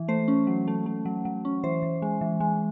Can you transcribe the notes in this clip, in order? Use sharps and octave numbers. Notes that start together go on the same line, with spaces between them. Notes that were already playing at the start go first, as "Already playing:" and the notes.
Already playing: E3
A3 C5
C#4
F#3
A3
A3
F#3
F#3
C#4
E3 C5
E3
G#3
E3
G#3